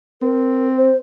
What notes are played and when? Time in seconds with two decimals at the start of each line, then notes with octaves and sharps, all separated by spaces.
0.22 C4 A#4
0.77 C5